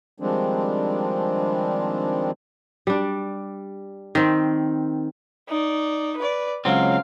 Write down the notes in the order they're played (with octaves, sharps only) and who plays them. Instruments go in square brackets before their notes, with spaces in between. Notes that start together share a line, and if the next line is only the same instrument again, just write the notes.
[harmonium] D#3 F3 G3 G#3 C4 D4
[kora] G3 D4
D#3 C4
[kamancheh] D#4 D5
B4 D5
[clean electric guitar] C#2 F#3 C4 [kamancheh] F5